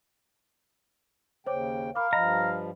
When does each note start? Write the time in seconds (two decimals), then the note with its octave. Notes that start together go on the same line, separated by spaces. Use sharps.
1.46 D#2 C#3 C5 C#5 G5 D6
1.95 A#4 F5 B5 D6
2.13 G2 F3 D#5 A#5 B5